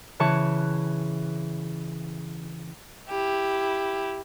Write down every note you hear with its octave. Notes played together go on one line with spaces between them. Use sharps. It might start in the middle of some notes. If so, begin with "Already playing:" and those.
C#3 E3 A5 C#6 F#6
E4 G4